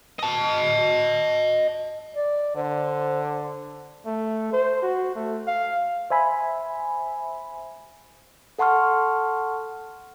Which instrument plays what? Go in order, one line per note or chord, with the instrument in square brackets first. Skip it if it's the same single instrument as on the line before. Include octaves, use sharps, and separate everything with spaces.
[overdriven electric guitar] D#5 A5
[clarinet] D5
[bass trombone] D3 [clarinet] C5
[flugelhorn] A3
C5
F#4
A3
F5
[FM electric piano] C5 E5 G#5 B5
[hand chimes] A4 F#5 A5 C6 C#6 F6